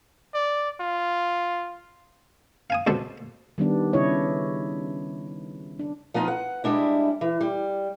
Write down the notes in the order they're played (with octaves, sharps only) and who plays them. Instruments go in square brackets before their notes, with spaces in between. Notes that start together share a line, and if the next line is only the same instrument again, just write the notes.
[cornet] D5
F4
[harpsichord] F5 G#5 D#6
C#2 B2 F#4 A4 C5 D5
[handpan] D#3 G3 B3 D4
C#3 D4 E4 C#5 D#5
D4
[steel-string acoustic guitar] F3 B3 D#4 F4
F#5
G3 G#3 D4 E4
E3
G3